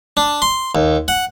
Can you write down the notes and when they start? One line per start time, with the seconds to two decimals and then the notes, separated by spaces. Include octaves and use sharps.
0.17 D4
0.42 C6
0.75 D#2
1.08 F#5